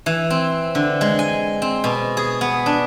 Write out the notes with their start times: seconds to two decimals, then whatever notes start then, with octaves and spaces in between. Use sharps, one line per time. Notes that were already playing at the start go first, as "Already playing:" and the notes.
0.06 E3
0.30 C4
0.75 D3
1.01 G#3
1.19 G#5
1.62 C4
1.84 B2
2.17 G#4
2.41 B3
2.66 D4